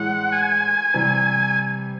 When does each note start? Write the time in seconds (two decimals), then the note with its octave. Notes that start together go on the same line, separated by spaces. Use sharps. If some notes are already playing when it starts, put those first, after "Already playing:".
Already playing: A2 E3 G#3 F#5
0.32 G#5
0.94 C3 E3 G3